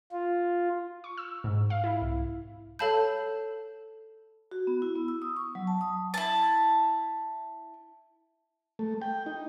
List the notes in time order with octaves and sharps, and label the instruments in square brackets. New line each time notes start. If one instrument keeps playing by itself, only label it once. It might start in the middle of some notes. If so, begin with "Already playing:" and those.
[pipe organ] F4
[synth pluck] C#6
E6
G#2
F5
E4
C2
[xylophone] A4 C#5 F5 A5 B5 G6
[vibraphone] F#4
B3
E4
B3
E6
D#6
C#6
F#3
A5
D#6
[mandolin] E4 A5
[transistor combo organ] A3
G5
D#4